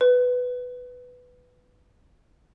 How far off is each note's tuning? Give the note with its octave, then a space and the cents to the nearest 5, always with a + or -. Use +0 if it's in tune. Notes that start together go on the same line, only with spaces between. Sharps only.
B4 +5